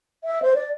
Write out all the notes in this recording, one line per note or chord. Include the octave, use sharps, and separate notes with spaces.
E5
C5
D5